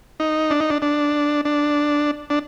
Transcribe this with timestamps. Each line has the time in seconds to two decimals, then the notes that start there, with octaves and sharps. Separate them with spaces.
0.20 D#4
0.50 D4
0.60 D#4
0.70 D4
0.82 D4
1.45 D4
2.30 D4